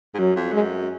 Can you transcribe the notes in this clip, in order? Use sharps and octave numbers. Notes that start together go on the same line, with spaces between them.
G#2
F#2 F#3
F2
F#2 G#3